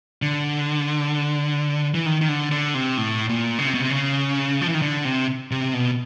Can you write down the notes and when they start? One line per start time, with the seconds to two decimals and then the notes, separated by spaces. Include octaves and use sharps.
0.22 D3
1.94 E3
2.06 D#3
2.21 D#3
2.28 D3
2.51 D3
2.75 C3
2.98 A2
3.29 A#2
3.59 C#3
3.67 C3
3.74 B2
3.80 C3
3.90 C#3
4.61 F3
4.68 E3
4.74 D#3
4.82 D3
5.05 C3
5.51 C3
5.74 B2